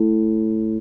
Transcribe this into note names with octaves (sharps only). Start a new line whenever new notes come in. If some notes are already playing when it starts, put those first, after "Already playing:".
Already playing: A2